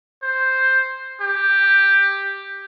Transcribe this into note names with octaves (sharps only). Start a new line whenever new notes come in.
C5
G4